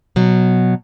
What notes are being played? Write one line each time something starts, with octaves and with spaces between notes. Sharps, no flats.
B2 F#3